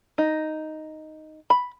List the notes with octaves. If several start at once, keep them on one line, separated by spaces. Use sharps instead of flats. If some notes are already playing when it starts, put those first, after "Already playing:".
D#4
B5